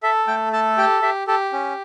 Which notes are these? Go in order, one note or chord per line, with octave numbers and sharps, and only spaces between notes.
A4 E5
A3 G5
A4 A5
G4 G5
G4 E5
G4 A4
C#4